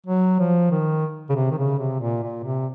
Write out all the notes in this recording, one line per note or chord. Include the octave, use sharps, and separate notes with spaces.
F#3
F3
D#3
C#3
C3
D#3
C#3
C3
A#2
A#2
C3